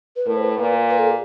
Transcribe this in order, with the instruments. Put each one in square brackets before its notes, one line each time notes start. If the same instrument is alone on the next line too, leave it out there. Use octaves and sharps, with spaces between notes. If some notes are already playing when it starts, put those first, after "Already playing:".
[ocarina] B4
[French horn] A2 [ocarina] A#4
[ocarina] C5
B4
[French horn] A#2 [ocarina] B4
[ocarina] B4
A4
G#4